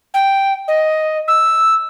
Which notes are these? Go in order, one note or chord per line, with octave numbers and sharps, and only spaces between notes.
G5
D#5
E6